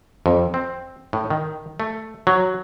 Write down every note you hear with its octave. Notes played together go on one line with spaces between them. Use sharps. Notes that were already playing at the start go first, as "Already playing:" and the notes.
F2
C4
A2
D#3
A3
F#3